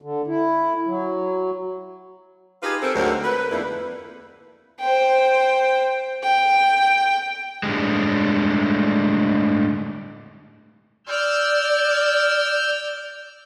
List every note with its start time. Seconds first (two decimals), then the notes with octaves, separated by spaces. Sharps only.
0.02 D3
0.27 E4
0.86 F#3
2.63 D#4 F4 G4 G#4 B4
2.82 C4 A4 A#4
2.95 D2 G#2 F#3 C4 A#4 F#5
3.23 B4
3.51 F2 G#2 D3 A3 A#3 E4
4.80 C5 G5
6.23 G5
7.63 A2 D3 G3 G#3
11.07 D5 E6 F6 G6